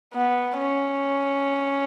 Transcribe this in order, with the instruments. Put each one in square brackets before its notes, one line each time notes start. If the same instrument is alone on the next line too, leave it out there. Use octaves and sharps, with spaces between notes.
[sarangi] B3
C#4